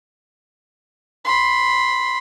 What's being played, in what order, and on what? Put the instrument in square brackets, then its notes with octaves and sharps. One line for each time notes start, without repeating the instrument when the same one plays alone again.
[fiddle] B5 C6